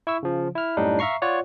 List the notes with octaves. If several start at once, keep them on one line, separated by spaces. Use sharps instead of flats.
E4 C#6 E6
C#3 F3
E4 F6
F#2 A2 G3 D4 D#4
E5 F5 A#5 C#6 C7
F4 C#5 D5 F#5